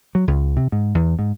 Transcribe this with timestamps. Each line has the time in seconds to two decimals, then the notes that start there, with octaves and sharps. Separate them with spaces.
0.15 F#3
0.28 C#2
0.57 C3
0.72 G#2
0.95 E2
1.19 G#2